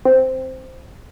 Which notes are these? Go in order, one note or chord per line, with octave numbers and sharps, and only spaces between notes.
C4